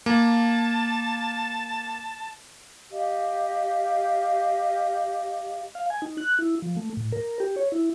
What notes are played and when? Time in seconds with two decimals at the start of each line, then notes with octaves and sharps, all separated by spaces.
0.06 A#3 A5
2.91 G4 D#5 F5
5.75 F5
5.90 G#5
6.02 D#4
6.17 F#6
6.39 E4
6.62 F3
6.77 A3
6.97 A2
7.12 A#4
7.40 G4
7.56 C#5
7.72 E4